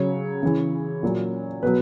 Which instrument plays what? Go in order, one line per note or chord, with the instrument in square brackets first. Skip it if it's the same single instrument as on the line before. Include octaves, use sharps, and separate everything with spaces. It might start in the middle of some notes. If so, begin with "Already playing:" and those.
Already playing: [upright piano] C#3 F#3 C#5
C#3 E3
A#2 F#3
B2 F#3 B4